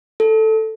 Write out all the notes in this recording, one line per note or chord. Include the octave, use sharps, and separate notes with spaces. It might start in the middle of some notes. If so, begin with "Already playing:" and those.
A4